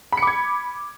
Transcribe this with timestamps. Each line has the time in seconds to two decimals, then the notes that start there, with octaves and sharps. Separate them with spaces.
0.12 B5
0.17 C#7
0.22 D6
0.27 G#6